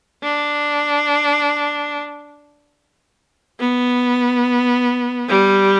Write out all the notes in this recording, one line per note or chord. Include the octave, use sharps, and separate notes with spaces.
D4
B3
G3